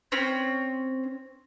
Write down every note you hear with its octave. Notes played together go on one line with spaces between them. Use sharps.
C4 C#4